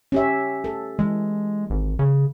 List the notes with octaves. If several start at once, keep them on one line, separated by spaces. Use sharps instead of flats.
C#4 G4 E5
A4
E3 G#3
G#1
C#3